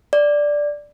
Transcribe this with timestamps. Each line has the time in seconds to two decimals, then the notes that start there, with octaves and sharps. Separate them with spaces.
0.13 D5